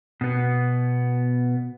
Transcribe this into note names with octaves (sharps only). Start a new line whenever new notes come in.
B2 B3